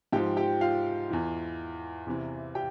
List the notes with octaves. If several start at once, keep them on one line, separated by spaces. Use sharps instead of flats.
G#2 F3 G4 G5
G4 G5
F4 F5
E2 E3
E2 C3 E3
G4 G5